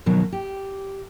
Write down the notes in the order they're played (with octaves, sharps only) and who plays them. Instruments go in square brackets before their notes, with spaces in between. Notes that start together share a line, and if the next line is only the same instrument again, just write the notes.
[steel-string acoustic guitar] F2 B2 D#3 F#3
G4